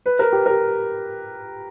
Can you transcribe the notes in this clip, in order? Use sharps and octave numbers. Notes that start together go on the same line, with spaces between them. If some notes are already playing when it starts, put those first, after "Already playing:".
B4
A#4
G4
A#4